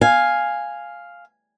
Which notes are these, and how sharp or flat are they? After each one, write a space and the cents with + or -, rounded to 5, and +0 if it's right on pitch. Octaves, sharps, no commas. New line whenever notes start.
F5 +0 G#5 +0